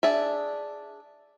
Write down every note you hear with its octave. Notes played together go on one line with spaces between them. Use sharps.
D4 G#4 E5